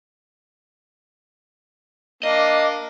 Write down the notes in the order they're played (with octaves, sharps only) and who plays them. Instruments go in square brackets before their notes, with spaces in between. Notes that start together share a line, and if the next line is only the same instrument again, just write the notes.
[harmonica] A#3 D4 [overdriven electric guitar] D#5